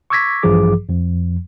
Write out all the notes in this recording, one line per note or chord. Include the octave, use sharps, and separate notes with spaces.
C#6 D6 E6 G#6 A#6 B6
A1 G2 E3 F3 G#4 D6
F2 F3